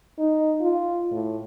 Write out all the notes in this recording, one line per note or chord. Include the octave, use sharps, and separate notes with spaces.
D#4
F4
A2